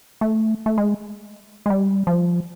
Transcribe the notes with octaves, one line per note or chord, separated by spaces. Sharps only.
A3
A3
G#3
G#3
G3
F3